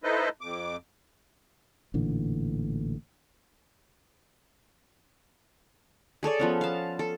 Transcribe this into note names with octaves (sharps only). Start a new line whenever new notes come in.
D#4 E4 A4 B4 C5 D#5
F2 D6
A1 A#2 D3 E3
G#4 A4 C#5 D5
F3 B3 C#4
F5 A5
A4